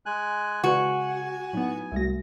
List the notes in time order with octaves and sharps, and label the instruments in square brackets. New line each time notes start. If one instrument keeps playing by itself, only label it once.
[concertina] G#3 G#5 F#6
[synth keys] C#3 [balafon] G#3 B4 D5 [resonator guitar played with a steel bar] F#4 [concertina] G#5
[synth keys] A2 B3 [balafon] F#3 D#4
[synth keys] C2 A#6 [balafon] G#3 A3 F#4